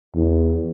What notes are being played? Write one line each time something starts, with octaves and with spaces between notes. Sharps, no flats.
E2